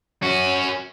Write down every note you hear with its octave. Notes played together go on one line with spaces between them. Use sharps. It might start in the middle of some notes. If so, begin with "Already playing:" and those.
C#4 F#4